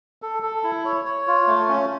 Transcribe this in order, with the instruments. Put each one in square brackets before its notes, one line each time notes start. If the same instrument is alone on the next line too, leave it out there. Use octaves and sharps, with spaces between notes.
[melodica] A4
A4
E4
C#5
C#5
F4
A3
C#4